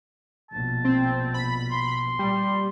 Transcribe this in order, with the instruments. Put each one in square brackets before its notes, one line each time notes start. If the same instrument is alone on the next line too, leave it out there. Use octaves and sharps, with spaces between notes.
[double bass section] A#1 B2 [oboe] A5
[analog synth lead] C4
B5
[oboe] C6
[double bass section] A#2 [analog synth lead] G3